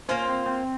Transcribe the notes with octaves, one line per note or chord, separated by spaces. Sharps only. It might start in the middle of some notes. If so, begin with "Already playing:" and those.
A#3 C#4 F4 C5
C4
C4